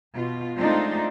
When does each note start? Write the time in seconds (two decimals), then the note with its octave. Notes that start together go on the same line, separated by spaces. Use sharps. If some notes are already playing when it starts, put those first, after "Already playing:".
0.13 B2 F4
0.57 G#3 A3 C4 D4 D#4 F4